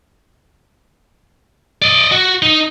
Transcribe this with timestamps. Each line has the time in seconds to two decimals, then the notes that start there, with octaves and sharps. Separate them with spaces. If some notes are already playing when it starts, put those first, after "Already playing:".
1.82 D5 D#5
2.12 F#4
2.42 D#4